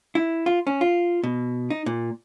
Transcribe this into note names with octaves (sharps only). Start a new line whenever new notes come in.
E4
F4
C#4
F4
B2
D#4
A#2